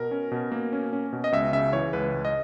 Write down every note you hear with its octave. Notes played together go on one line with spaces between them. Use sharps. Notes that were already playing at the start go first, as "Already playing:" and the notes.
Already playing: B2 A#4
C#4
B2
A#3
C#4
C#4
B2
D#5
C#2 E5
C#3 E5
E3 C#5
C#2 B4
C#2
D#5